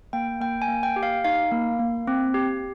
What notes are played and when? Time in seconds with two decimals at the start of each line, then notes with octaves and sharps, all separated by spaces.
0.13 A#3 G5
0.41 A#3 G5
0.62 G#5
0.68 A#3
0.83 G5
0.96 G4
1.03 F5
1.24 D#4 F5
1.51 A#3
1.80 A#3
2.08 C4
2.34 G4